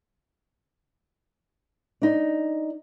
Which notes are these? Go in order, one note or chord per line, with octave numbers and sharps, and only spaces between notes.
D4 D#4